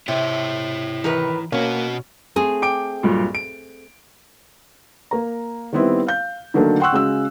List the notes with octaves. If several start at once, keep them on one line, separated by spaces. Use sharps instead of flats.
C3 E4 C#5
D#3 E3 A#4 B4
B2 A#3 C#4 F#4
A3 C4 G#4
G5 D6 D7
B1 G2 A#2
D7
A#3 A#5
D#3 G3 B3 C4 E4
F5 G6
D3 D#3 F#3 A3 A#3 D4
F#5 G5 C6 C#6 E6 F#6
C#3 G#3 F#4 E6